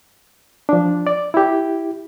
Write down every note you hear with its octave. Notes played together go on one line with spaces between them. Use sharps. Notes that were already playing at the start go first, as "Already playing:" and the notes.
F3 D4
D5
E4 G4